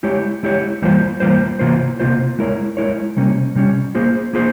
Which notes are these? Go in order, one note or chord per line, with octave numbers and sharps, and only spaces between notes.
G#3 E4 G4 C#5
G#3 E4 G4 C#5
E3 G3 A#3 F4 C5
E3 G3 A#3 F4 C5
C3 E3 A#3 F4 C5
C3 E3 A#3 F4 C5
G#3 E4 A#4 C#5
G#3 E4 A#4 C#5
C3 G3 A#3 C#4
C3 G3 A#3 C#4
A#3 F4 G#4 C5
A#3 F4 G#4 C5